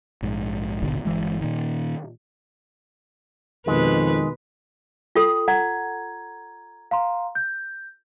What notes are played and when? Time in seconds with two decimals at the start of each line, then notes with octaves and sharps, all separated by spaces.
0.22 A#1 G#2
0.82 D#1 G#1 B2 D3
1.05 G1 E3 G#3
1.41 A#2 D#3
3.67 F2 B2 D#3 G#3 B4
5.15 F4 A4 G5 D#6
5.48 F#5 A#5 G#6
6.91 F5 A#5 C6
7.35 G6